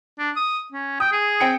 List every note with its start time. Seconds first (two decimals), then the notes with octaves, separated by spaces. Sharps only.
0.19 D4
0.36 D#6
0.72 C#4
1.00 G5 D#6
1.12 G#4
1.40 C4 G5 C#7